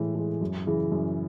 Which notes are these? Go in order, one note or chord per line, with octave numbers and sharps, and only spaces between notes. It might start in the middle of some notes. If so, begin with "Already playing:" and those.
Already playing: A2 E3 G#3
E3 G#3
F#2
C#3 E3
F#2